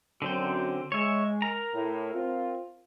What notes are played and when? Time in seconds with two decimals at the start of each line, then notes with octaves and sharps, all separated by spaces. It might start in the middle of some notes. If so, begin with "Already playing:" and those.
0.22 F#2 D3 F#3 C4 C5
0.92 G#3 C#5 E5
1.42 A#4 A#5
1.74 A2
2.14 C4 F4